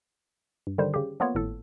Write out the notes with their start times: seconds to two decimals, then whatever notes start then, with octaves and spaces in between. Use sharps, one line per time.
0.67 G2
0.78 D3 D#3 G3 C5
0.94 C#3 G4
1.20 F3 A#3 B3 F4 C#5
1.35 G#1 A2 A4